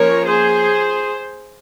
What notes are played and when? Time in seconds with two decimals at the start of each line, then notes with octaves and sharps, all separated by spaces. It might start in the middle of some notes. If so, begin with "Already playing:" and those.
Already playing: F3 A#3 C#4 A#4 C#5
0.26 G#4 C5